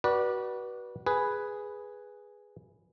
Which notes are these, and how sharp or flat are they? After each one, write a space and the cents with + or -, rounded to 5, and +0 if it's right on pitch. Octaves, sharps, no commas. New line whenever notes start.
F#4 +30 B4 -25 D5 +10
G#4 +0 B4 +0